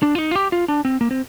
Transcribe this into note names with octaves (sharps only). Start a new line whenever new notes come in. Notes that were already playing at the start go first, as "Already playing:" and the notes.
D4
F4
D#4
F4
G4
F4
D4
C4
A#3
C4